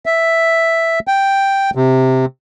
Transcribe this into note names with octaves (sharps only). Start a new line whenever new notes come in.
E5
G5
C3